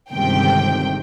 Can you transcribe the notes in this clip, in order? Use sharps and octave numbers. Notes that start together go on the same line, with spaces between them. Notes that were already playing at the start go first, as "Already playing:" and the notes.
G1 C#2 C3 D#3 G5